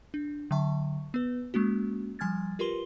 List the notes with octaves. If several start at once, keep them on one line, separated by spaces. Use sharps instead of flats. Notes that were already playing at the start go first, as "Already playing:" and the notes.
D4
D3 F#3 E5 A5 C#6
B3 B4
G#3 A#3 C#4 F#4
F3 G3 G#5 F6 G#6 A6
F4 G4 A#4 B4 C6 G7